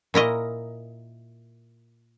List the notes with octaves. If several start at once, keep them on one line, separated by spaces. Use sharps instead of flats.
A#2 E4 A#4 D#5